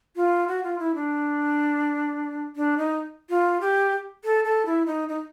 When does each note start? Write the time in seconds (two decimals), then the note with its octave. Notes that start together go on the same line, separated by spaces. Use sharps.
0.16 F4
0.48 F#4
0.64 F4
0.79 E4
0.95 D4
2.56 D4
2.78 D#4
3.30 F4
3.61 G4
4.24 A4
4.45 A4
4.66 E4
4.86 D#4
5.09 D#4